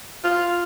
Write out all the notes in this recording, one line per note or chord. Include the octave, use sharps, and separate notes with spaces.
F4